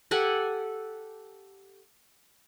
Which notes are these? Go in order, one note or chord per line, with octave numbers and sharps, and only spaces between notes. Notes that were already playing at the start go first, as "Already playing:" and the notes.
G4 A4 F#5 G#5